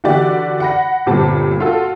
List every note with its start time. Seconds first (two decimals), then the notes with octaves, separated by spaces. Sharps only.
0.04 D3 E3 F#4 G4 D5
0.60 F#5 B5 A#6
1.06 G1 A#2 G3 C4 A5
1.60 F4 F#4 A4